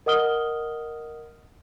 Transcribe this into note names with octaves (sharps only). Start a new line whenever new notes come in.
A#4 D#5 F#5 D#6 F6 G7